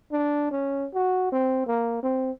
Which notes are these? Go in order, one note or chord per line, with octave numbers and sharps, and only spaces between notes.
D4
C#4
F#4
C4
A#3
C4